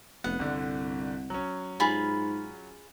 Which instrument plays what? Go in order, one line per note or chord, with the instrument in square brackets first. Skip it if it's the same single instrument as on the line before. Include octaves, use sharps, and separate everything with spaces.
[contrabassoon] F1 [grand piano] B3 [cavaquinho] F#5
[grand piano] G1 D3 [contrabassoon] C2
[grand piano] F#3 C#4
[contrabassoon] G#2 [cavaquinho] F4 G#4 B5